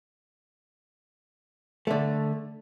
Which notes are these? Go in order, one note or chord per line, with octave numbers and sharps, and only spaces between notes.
D3 A3